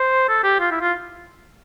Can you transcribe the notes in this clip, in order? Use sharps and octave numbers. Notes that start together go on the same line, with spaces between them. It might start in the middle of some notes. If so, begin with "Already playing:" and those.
Already playing: C5
A4
G4
F4
E4
F4